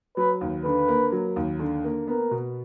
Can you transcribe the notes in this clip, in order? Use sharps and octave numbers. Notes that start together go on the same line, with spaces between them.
F#3 B4
D#2
D3 B4
A#3
F#3
D#2
D3
A#3
B3 A#4
B2